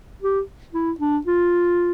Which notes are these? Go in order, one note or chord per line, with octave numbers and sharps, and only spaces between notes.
G4
E4
D4
F4